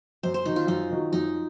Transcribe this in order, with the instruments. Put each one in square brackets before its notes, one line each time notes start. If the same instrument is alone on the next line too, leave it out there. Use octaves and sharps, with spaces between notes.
[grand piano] F#2 [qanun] C5
[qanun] C5
[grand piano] D#3 F#3 [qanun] D#4
[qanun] F4
[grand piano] F#2 [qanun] D#4
[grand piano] D#3 F#3
[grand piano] F#2 [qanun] D#4